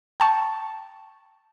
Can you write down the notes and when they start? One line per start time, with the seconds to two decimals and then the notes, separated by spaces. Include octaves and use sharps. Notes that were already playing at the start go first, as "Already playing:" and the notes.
0.20 G5 A5 C#6